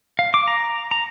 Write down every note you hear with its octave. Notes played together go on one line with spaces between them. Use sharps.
F5
D6
A#5
A#5